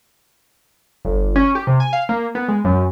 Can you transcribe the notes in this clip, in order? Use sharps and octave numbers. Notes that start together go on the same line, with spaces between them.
G1
C#4
G4
C3
G#5
F5
A#3
B3
G#3
F#2